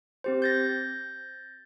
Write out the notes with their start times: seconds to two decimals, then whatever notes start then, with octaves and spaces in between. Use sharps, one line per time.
0.24 C4 G4 C5
0.42 G6 A6 A#6